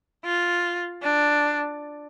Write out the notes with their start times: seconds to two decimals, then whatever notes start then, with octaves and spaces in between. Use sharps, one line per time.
0.25 F4
1.03 D4